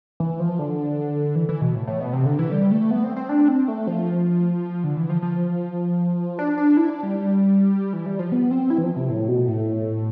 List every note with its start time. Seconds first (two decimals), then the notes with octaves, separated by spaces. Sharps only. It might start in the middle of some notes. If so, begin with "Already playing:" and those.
0.20 E3
0.40 F3
0.59 D3
1.35 E3
1.49 E3
1.61 B2
1.75 A2
1.87 A2
2.00 B2
2.13 C3
2.26 D3
2.39 E3
2.52 G3
2.71 A3
2.91 B3
3.04 C4
3.16 C4
3.29 D4
3.48 C4
3.68 A3
3.87 F3
4.84 D3
4.97 E3
5.10 F3
5.22 F3
6.39 D4
6.58 D4
6.77 E4
6.90 D4
7.03 G3
7.93 E3
8.06 G3
8.19 F3
8.32 B3
8.51 C4
8.70 E4
8.78 E3
8.83 F3
8.96 C3
9.09 A2
9.28 B2
9.48 A2